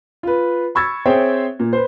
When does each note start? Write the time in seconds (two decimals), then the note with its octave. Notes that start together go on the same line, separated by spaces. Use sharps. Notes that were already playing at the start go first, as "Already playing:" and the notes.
0.23 F4 B4
0.75 B5 C#6 E6 G#6 A6
1.06 C4 G#4 C5 C#5 E5 G5
1.60 A#2
1.73 B4 C5